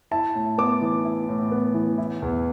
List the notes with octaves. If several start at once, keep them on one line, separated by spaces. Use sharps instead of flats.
E4 A5
A2
B3 D6
E3
E4
A2
B3
E3
E4
E2